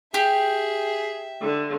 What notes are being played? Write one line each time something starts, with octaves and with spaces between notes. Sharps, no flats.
G4 G#4 E5
D3